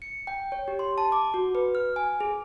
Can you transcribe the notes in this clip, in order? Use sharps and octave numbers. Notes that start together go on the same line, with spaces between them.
C#7
G5
C#5
G4
C6
A5
D6
F#4
B4
F6
G#5
G#4